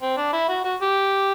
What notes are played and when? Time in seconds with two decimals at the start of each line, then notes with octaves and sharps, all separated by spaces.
0.02 C4
0.17 D4
0.33 E4
0.48 F#4
0.64 F#4
0.81 G4